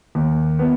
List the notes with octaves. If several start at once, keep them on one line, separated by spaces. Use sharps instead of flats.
D#2
B3